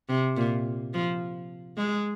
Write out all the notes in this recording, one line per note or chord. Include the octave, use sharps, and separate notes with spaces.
C3
A#2
F3
G#3